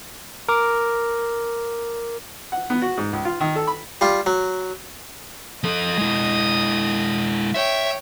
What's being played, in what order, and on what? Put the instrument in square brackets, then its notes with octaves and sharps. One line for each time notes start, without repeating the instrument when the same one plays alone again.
[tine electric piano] A#4 D6
[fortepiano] F#5
B3
F#4
G#2
C#2
F4
D#3
A4
B5
[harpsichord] G3 F4
F#3
[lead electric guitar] F3 A4 [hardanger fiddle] D#5 D#6
[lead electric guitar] G#3 E4
[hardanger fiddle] C#5 G5 [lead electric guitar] E5